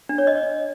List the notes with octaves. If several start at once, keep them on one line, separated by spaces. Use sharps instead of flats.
D4
C#5
D#5